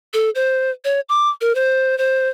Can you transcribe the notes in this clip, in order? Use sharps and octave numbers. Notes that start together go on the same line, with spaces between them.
A4
C5
C#5
D6
A#4
C5
C5